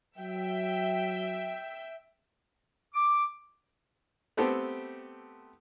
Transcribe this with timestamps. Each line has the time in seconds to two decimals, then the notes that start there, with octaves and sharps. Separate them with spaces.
0.18 F#3 E5 G5
2.94 D6
4.37 A3 B3 C4 G4 A4